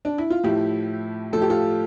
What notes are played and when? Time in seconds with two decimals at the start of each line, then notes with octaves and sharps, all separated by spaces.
0.05 D4
0.18 E4
0.30 F4
0.44 A2 F3 E4 G4
1.33 A2 F3 A4
1.42 G4
1.50 F4 A4